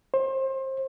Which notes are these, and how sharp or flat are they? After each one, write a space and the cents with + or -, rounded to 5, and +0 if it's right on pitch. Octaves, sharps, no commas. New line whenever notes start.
C5 +30